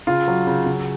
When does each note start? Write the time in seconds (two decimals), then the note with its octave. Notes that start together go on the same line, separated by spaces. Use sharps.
0.07 C#3 F4
0.28 F#3
0.47 C#3
0.66 C#3